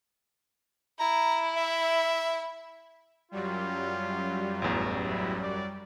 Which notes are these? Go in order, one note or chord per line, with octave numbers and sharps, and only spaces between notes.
E4 A#5
E5
F#2 F#3 G3 F4
A1 E2
E4
D5